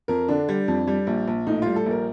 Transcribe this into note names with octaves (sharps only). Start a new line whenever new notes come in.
F2 A#4
D3 D4
G3
F2
G3
A#1
A#1
A2 D#4
G3 F4
A4
A#1 A#4